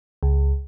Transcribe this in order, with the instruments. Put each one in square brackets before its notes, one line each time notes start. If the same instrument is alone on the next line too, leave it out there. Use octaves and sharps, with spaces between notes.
[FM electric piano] C#2